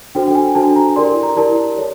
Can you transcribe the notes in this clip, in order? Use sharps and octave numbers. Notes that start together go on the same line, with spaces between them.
D4 F#4 A4 C5 G5
G5
G#5
D4 F#4 A4 C5 A5
A#5
E4 G4 A#4 D5 C6
A#5
E4 G4 A#4 D5 A5
A4 C#5